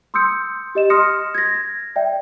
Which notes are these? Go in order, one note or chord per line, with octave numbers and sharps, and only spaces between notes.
C6 D#6 E6 G6 C#7
G4 D#5 E7
C6 D#6 F6 A#6 C#7
G#6 A#6
D5 E5 G5